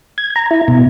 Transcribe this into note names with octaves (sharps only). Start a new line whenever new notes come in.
G#6
A#5
E4
B2